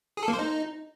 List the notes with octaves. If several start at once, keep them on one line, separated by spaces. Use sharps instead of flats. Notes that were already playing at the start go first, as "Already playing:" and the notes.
G#4
A4
A#3
C5
D#4